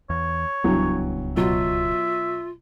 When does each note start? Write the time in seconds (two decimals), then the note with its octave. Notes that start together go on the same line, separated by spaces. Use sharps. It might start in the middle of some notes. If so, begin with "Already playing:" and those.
0.10 E2 C#5
0.64 D1 C#2 G2 E3 F#3 B3
1.37 B2 F#3 F4 E5